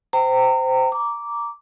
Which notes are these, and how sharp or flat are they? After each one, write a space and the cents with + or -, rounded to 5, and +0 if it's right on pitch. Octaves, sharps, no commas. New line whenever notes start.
C5 -15 G5 -20 A#5 -30
A#5 +0 D6 -10